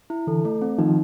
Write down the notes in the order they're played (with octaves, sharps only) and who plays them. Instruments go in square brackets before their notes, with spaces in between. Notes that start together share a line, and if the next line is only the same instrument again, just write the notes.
[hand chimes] E4
[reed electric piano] D3 E3 [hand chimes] A4
[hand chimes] A3
C4
[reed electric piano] D#3 F3 [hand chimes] D#4